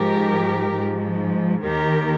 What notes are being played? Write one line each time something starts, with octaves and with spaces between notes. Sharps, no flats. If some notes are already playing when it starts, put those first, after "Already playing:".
Already playing: G#2 F3 G4 A#4
G#2
F3
D#2 D#3 G4 A#4